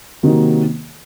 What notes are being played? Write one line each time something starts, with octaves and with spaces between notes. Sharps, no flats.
C3 D#3 F#3 A#3 D#4